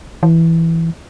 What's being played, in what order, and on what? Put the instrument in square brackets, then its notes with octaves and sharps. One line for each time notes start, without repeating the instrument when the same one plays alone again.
[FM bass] E3